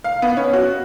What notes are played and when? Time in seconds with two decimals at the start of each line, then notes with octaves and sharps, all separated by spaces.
0.04 F5
0.22 B3
0.37 C#4
0.53 F#4